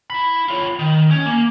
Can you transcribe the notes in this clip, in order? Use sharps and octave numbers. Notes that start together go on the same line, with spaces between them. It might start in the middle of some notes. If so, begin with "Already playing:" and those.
E4 B5
F4 C#5
D#3
C#4
A#3